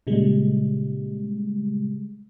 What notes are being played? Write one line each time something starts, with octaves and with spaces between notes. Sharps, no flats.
A#2 C#3 G3 G#3